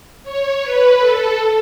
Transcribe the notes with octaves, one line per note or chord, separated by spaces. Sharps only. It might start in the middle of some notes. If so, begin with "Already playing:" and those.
C#5
B4
A4